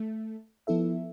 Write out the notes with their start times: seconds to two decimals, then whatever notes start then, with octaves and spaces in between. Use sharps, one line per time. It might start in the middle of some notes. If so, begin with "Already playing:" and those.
Already playing: A3
0.67 F3 B3 E4 A4 E5